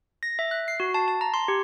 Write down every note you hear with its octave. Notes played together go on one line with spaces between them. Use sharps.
A#6
E5
F#6
C7
F#4
A5
A5
A#5
C6
G4